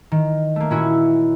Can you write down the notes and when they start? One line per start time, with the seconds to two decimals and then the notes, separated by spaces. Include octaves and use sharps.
0.12 D#3
0.56 A3 A#3
0.70 A#2 C#4 E4 F#4 C#5